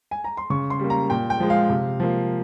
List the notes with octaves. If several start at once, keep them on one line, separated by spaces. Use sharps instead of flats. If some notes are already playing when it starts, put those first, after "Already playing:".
G#5
A#5
C6
C#3 C#6
C6
G3 A#3
A#5
A#2 G5
G5
F3 G#3
F5
C3
F3 A#3